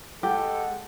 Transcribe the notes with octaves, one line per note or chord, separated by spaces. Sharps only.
G#3 G4 A4 F#5